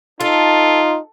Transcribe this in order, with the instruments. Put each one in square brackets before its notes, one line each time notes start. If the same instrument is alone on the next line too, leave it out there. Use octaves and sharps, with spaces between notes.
[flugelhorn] D#4 [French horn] F4 [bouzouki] A4